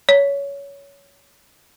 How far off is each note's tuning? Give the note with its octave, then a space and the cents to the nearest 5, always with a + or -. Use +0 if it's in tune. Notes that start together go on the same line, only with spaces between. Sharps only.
C#5 +15